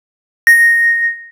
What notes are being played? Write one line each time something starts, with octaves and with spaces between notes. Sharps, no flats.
A#6